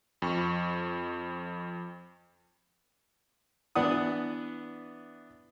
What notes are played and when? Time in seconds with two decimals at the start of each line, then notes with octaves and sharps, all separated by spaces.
0.22 F2 C#6
3.75 E3 B3 D4 F#5 D#6